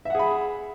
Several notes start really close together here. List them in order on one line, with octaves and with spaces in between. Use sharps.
E5 F#5 G#4 B5